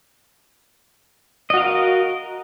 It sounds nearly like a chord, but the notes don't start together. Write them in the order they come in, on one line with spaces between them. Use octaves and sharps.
D#5 F#4 F5 A#4